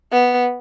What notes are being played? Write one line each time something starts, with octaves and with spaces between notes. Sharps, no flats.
B3